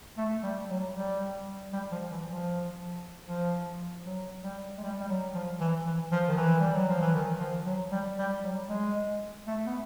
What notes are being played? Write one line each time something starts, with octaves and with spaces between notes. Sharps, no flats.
A3
G3
F#3
G3
G3
F3
E3
F3
F3
F#3
G3
G#3
G3
G3
F#3
F3
E3
E3
F3
D#3
E3
G3
F#3
F3
E3
D#3
F3
F#3
G3
G3
F#3
G#3
A3
B3